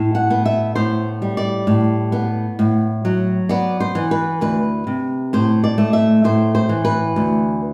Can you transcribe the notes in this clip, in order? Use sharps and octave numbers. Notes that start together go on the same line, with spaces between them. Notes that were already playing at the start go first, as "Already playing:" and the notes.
Already playing: A2
F#5
B3
E5
A2 C5
G3
D5
A2
B3
A2
F#3
B3 D5
C5
E3
B4
D2 B4
C3
A2 C5
D5
A3
E5
A2 C5
C5
E3
B4
D2